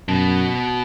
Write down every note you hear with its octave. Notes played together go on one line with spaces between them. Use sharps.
F#2 B2